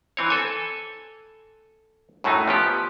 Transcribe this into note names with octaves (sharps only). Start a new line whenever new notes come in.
E3 C4 C#5
A4 G#5
F#2 A2 F#3 A3 D#4
F3 B3 G4